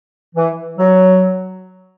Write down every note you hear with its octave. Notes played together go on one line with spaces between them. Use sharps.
E3
F#3